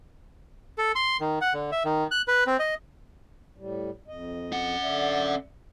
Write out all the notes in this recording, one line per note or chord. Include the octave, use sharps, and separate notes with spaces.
A4
C6
D#3
F#5
D3
E5
D#3
F#6
B4
C4
D#5
A2 G3
F2 D#5
C#4 F#5
D3 D5 E5